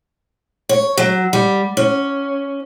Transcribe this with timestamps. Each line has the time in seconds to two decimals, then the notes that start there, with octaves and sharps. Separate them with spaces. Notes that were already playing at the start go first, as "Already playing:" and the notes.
0.69 C#5
0.98 F#3
1.33 G3
1.77 C#4